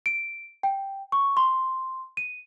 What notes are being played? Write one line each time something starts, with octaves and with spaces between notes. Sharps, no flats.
D7
G5
C#6
C6
D#7